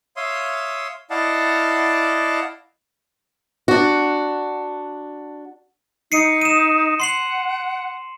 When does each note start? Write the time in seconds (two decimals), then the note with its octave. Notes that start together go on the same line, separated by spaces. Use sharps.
0.17 C#5 E5 F5 C6 D#6
1.10 E4 D5 D#5 F5 F#5 A5
3.68 D4 F#4
6.12 D#4 C7 C#7 D#7
6.41 D#7 E7
7.00 F#5 C6 C7 F#7